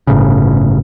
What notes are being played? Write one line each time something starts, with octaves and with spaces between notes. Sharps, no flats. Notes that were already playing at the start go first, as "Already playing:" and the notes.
G1 A2 C#3